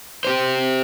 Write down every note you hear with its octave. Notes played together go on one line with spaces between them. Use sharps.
G4 C5